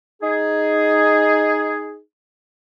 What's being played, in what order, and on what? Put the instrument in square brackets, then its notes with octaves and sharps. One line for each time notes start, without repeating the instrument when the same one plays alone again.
[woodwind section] D#4 G#4